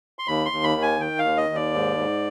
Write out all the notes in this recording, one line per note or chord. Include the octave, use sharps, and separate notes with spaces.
C6
D#2 B5
C6
D#2
B5
D#3
G#5
D#3 G5
F5
D#2
D#5
D#2
D5
G#2
G#2